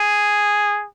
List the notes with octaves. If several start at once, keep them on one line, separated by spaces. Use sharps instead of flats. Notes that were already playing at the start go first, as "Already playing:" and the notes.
Already playing: G#4